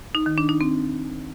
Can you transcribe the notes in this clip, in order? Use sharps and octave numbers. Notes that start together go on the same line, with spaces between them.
D#4
D#3
D4
D#4
C4